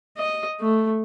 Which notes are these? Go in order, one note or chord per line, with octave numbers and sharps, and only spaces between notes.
D#5
A3